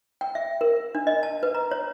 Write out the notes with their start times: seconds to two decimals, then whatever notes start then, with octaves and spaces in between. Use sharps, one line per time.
0.21 G5
0.35 E5
0.61 A#4
0.95 D4
1.07 D#5
1.23 A5
1.43 B4
1.55 A#5
1.71 C#5